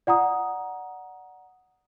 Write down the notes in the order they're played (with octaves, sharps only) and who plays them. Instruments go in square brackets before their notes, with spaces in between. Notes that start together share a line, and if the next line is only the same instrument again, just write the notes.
[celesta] D5 F#5 A#5 D#6